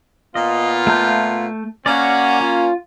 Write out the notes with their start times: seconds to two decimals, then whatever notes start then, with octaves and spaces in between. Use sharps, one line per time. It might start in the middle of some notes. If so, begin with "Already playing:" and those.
0.35 A#2 B3 F4 D#5
0.87 A3 A5 G6
1.86 A#3 C#4 F#4 D5
2.41 F4